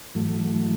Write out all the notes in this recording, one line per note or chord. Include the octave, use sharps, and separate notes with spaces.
G#2 E3 F#3 A3